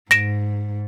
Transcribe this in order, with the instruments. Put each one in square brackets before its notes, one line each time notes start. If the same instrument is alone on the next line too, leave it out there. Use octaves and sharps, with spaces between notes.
[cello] G#2 [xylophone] A#6 D7 E7